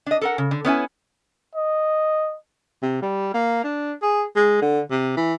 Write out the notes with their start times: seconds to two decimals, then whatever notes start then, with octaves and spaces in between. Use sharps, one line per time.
0.06 D4 D#5
0.21 A4 A#4 F#5
0.38 C#3
0.51 D3
0.65 B3 C#4 E4 G#5
1.55 D#5
2.82 C3
3.02 G3
3.34 A#3
3.64 D4
4.02 G#4
4.36 G#3
4.61 D3
4.91 C3
5.17 E3